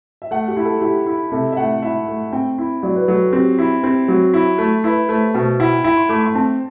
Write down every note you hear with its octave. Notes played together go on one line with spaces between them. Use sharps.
E5
A3 F#5
G4
E4
A4
E4 G4
E4
C3 A4
E5
A3 F#5
E4 E5
A3
C4 G5
E4
F#3 D5
B4
F#3 A4
A4
C4 G4
E4
C4 G4
F#3
E4
A3
E4 B4
A3 C5
B2 C5
E5
E4 F#5
G5
E4 G5
C6
A3 D6
C6
C4 A5